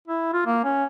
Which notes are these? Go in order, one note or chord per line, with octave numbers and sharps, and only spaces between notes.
E4
F4
A#3
C#4